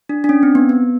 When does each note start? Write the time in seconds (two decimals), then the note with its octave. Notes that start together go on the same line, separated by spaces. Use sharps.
0.09 D4
0.24 D4
0.29 C#4
0.43 C4
0.55 B3
0.69 B3